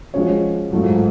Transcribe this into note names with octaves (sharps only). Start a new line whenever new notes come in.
F3 G#3 C#4 F#4 C#5
G#2 F#3 A3 F4 A4